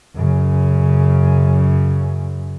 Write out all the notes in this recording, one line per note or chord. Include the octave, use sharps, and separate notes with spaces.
F#2 C#3